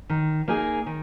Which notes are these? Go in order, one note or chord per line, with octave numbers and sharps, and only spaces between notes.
D#3
A#3 D#4 G#4
D#3